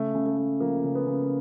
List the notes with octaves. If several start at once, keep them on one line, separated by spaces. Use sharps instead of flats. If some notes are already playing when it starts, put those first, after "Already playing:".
Already playing: C#3 A3
C#3
A3
A3
F3 A#3
C#3
B3
C#3